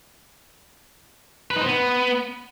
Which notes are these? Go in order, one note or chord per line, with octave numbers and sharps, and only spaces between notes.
B4
D#4
C5
B3